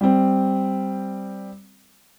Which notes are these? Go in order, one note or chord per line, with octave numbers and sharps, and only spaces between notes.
G3 C4